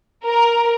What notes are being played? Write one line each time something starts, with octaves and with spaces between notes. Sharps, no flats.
A#4